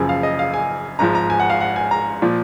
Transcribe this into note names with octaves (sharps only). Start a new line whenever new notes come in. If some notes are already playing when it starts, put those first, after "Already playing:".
Already playing: F#1 F#2 C#3 F3 G#5
F5
D#5
F5
G#5
G#1 G#2 F3 A#5
A#5
G#5
F#5
F5
F#5
G#5
A#5
A#2 F3